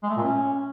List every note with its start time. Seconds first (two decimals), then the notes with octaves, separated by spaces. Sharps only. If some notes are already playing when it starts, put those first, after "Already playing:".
0.03 G#3
0.10 A3
0.16 A#2
0.23 C#4